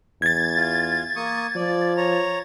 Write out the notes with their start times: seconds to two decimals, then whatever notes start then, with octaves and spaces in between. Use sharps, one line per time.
0.22 E2 G#6 A6
0.56 F4
1.16 A#3 C#6 D#6
1.56 F3 D5
1.97 C#5 A#5